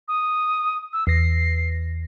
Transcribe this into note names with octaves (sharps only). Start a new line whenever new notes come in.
D#6
E6
E2 A#6 C7